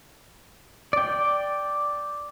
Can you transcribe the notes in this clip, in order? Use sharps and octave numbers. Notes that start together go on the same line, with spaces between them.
D5 G5